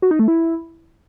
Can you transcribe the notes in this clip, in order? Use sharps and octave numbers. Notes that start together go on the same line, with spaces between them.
F#4
D#4
A3
E4